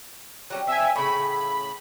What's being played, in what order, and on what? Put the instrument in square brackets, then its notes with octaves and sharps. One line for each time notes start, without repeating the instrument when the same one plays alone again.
[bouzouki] F#3 G3 C#4
[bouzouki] C4 [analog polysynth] E5 G#5
[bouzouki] A2 C#3 [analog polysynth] B5